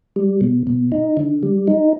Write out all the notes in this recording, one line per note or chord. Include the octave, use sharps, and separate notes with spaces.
G3
B2
B2
D#4
D3
G3
D#4